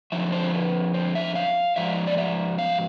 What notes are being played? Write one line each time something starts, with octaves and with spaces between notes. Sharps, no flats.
F2 D3 F3 E5
C5
A4
B4
C5
E5
F5
G#2 F3 E5
D5
E5
F5